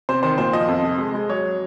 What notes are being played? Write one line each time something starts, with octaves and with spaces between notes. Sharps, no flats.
C3 C5
D#3 C5
A#2 C5
F3 D#5
F2
C3
G#3
G#3
F#3 C#5
F#3